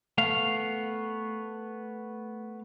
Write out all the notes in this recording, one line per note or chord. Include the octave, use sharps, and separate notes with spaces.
A3 B3 F5